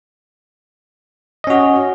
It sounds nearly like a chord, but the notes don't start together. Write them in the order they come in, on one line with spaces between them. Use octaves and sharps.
D#5 C#4 F#4